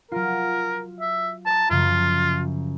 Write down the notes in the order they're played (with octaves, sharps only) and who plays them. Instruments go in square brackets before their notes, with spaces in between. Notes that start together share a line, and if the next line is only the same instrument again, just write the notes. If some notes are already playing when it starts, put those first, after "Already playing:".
[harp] F#3 F4 [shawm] A#4
[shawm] E5
[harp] C5 A#5 D#6 [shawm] A5
[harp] F#2 C#3 F3 [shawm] F4